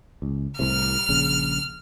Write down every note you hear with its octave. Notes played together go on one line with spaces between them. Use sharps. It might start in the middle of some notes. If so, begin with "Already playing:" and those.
C#2
C2 A2 C3 F6
A#1 C#3